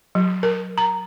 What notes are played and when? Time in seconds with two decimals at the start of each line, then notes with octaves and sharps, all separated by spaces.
0.15 F#3
0.43 A#4
0.78 A#5